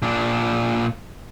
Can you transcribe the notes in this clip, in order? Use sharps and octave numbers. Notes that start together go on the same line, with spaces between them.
A#2 D4